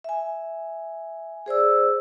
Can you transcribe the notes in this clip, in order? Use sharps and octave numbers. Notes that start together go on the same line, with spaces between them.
E5 G#5
G#4 C5 D5 E6